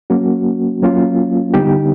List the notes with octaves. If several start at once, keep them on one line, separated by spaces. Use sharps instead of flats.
F#3 A#3 C#4 F#4
F#3 A#3 C#4 F4
D3 G3 B3 D#4 G4